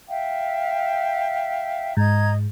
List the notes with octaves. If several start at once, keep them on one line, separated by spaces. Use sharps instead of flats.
E5 F5 G5
G#2 D#5 A#5 G#6